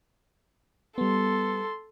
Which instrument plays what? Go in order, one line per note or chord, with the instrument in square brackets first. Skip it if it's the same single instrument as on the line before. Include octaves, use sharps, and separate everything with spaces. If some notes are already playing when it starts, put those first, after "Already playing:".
[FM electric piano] G3 B3 [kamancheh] A4 C6